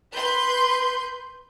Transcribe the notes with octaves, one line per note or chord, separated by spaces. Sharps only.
B4 C6 G6